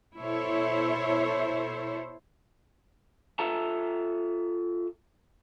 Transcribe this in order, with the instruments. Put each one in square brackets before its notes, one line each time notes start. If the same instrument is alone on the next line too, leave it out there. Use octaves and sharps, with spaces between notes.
[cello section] B2 E4 A4 C5 C#5 E5
[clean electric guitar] F4 A4 E5 A5 A#5